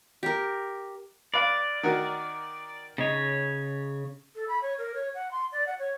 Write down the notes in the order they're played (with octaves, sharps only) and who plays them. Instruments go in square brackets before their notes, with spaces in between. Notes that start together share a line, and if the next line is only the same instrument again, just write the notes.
[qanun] G4 A#4
[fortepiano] B4 F5 [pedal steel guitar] D5
[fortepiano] D#3 F#4 A#4
[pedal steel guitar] C#3 C#5 [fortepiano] D#4
[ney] A4
B5
C#5
A#4
C#5
F#5
C6
D5
F#5
C#5